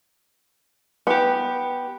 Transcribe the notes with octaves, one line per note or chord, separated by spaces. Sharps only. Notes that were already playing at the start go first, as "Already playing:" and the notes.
B3 G4